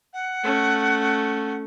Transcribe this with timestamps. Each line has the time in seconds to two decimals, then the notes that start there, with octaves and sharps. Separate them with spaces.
0.13 F#5
0.44 A3 C#4